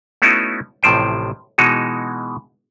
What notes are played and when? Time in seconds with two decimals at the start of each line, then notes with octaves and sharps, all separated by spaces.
0.22 A3 B3 C#4 D#4 E4 F#4
0.83 A1 A2 C3 F3 C5 G5
1.58 B2 E3 G#3 D#4 F#4